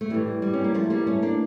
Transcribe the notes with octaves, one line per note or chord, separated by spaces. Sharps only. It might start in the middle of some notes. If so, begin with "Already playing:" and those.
A3
A2 E3 G3
G3
C#4
A#3
F3 A3
G3 A#3
A3 C#4
A#3 D4